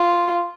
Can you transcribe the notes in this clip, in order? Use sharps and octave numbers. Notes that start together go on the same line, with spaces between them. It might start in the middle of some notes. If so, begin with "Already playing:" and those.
Already playing: F4